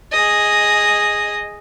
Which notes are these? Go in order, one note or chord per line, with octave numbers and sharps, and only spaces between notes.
G#4 D#5